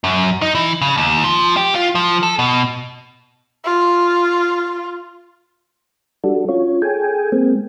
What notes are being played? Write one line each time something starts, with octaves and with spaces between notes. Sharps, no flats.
F#2
D#4
E3
C#3
D#2
F3
G4
F4
F3
A4
B2
F4
G3 D4 F#4 A4
C#4 F4 C#5
G#4 A4 G5 G#5
G#3 A#3 C4